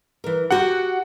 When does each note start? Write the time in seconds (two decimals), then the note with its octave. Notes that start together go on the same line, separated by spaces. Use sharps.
0.24 E3 A#4
0.51 F#4 G4 A#4 F#5